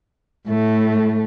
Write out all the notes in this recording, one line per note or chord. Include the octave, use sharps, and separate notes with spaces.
A2 A3